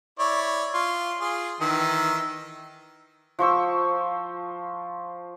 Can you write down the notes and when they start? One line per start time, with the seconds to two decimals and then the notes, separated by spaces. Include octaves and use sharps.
0.19 E4 C#5 D5
0.74 F4
1.21 F4 G#4
1.60 D#3 E3 E6
3.39 F3 C5 C#6 E6